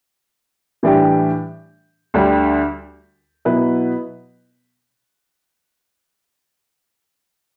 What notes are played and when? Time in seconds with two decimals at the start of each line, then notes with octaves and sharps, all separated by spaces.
0.83 A2 E3 G3 D4 G4
2.14 D2 D3 G3
3.45 B2 F#3 B3 E4 B4